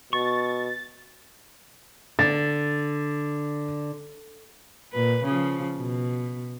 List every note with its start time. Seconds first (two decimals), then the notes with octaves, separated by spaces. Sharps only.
0.13 B2 C#6 A6
2.19 D3 A6
4.93 A#2 B4
5.24 C#3 F3
5.76 B2